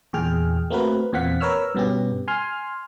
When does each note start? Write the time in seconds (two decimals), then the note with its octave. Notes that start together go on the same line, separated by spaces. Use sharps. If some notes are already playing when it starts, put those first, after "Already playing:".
0.13 E2 A#2 G#4 G5 F6
0.70 A3 A#3 C4 F#4 A#4 B4
1.12 E2 A#2 C4 F5 F#5 B6
1.40 A#4 B4 C#5 E6 F6
1.75 G2 B2 B3 C#4 G4
2.28 G#5 C6 F6